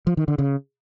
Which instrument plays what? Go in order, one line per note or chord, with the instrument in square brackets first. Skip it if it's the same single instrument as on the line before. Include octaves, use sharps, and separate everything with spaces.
[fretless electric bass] F3
D#3
D3
C#3